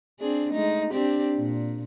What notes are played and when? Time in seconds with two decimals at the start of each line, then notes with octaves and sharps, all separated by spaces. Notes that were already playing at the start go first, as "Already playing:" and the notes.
0.19 C4 D4 G#4
0.52 G#3 A3 D#4
0.90 C4 D4 G4
1.36 A#2